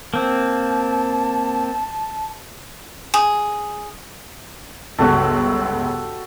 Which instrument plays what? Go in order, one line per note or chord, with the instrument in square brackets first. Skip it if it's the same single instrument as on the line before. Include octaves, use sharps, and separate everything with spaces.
[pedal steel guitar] A#3 C4 [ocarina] A5
[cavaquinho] G#4
[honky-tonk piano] G1 C#2 [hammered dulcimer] F#4 G4 A4